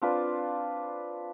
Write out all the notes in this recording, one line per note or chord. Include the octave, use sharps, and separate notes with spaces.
C4 D4 F4 B4